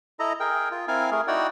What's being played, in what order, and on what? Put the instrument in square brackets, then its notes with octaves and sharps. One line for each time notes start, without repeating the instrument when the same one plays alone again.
[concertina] E4 A4 D#5 A#5
G#4 A#4 G5
F4
C4 E4 A#4 F5 G#5
A3 G#4 A#4
D#4 E4 F#4 D5 F#5 G5